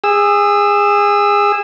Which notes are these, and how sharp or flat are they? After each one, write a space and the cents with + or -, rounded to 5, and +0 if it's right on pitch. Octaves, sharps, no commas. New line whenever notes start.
G#4 -25 E6 +0